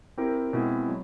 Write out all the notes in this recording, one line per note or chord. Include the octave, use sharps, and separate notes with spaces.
C4 E4 G4 A#4
B2 G#3 C4 E4
F#3